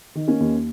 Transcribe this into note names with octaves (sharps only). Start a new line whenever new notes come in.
D#3
A#3 C#4
D#2